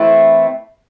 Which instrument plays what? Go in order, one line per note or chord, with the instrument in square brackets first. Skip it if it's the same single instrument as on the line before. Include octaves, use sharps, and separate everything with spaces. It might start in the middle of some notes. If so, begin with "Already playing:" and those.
Already playing: [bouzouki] E3 A3 C4 E4